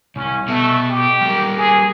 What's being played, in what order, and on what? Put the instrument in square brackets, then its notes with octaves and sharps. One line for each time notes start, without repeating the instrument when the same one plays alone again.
[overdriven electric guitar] C2 [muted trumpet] C#4
[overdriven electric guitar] B2 [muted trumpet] A3
[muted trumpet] G4
[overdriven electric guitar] G3 A#3
[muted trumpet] G#4